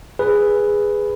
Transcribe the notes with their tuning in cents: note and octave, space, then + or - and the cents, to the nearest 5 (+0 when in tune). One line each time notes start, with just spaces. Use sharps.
G#4 -5 B4 +0